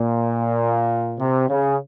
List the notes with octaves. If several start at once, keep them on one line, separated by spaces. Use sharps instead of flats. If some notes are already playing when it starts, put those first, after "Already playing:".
Already playing: A#2
C3
C#3